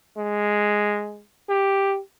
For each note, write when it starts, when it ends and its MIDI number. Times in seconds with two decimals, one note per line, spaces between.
0.17 1.22 56
1.49 1.99 67